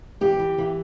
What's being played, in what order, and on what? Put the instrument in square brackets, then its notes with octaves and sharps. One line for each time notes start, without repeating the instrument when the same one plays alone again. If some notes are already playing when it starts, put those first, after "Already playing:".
[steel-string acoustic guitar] E3 G4
E3
E3